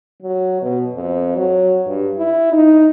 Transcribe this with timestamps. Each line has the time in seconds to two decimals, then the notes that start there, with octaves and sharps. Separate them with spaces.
0.23 F#3
0.62 B2
0.95 F2
1.36 F#3
1.87 G2
2.17 E4
2.52 D#4